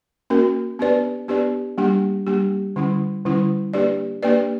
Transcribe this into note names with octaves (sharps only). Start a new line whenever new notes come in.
A#3 C#4 F#4 A#4
B3 D4 G4 B4 D5
B3 D4 G4 B4 D5
G3 A#3 D4 G4
G3 A#3 D4 G4
D3 G3 C#4 E4
D3 G3 C#4 E4
A#3 D4 G4 B4 D5
A#3 D4 G4 B4 D5